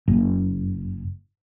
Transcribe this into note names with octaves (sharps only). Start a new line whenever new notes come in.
F#1